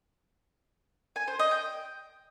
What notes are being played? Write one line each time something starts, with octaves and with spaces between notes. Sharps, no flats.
G#5
C5
D#5
G5